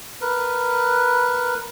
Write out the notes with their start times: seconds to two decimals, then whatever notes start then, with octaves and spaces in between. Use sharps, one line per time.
0.21 A#4 B4